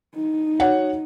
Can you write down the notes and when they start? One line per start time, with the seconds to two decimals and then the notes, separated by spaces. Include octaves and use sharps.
0.15 D#4
0.60 F#4 C#5 F#5